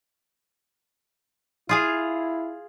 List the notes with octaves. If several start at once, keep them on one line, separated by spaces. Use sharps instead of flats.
E4 F4 G#4 F5